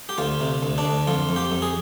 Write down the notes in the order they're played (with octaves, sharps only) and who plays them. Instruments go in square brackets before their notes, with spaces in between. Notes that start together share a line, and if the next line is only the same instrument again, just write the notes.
[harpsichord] G4
D2 F4
C3
D2
D4
D2
F2 F4
F2
G4
F2
G#4